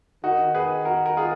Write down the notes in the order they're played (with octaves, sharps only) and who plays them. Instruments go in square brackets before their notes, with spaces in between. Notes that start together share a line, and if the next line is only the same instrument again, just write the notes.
[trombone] D#3 [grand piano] D#4 F#4
[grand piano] G#4 B4
F#4 A#4
A#4
F4 G#4